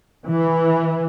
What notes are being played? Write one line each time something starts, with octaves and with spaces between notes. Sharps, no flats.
E3